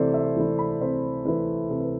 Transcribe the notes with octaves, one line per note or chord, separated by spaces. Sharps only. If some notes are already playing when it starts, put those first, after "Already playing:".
Already playing: C3 E3 A3 E4 A4 C5 D5
E5
E3 A3 E4
B5
C3 C5
E3 A3 E4 B4
C3 A4
B4